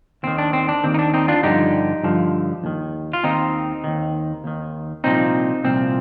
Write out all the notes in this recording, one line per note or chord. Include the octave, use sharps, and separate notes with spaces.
D#2 D#3 C4
D4
C4
D4
D#2 D#3 C4
D#4
D4
C4 D#4
D4 F4
G2 D3 F3 D#4 G4
G2 D3 F3
D#2 D#3
F4
D#2 D#3 C4 D#4
D#2 D#3
D#2 D#3
C2 A#2 F3 C4 D#4
C2 A#2 F3 C4